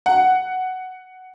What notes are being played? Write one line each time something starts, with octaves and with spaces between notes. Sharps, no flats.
F#5